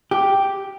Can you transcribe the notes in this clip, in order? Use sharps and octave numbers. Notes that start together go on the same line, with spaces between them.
G4